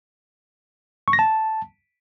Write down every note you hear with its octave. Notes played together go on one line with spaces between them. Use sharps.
C#6
A#6
A5